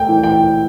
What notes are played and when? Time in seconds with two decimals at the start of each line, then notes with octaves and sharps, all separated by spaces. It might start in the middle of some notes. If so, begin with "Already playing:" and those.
Already playing: A3 G5
0.09 E3
0.24 G5